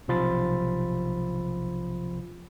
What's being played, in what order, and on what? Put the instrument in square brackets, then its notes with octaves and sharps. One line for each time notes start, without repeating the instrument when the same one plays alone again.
[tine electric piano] B1 C3 F3 F4 B5 A6